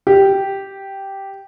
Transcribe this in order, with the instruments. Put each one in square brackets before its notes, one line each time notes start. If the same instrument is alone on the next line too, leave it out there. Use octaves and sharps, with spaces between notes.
[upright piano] G4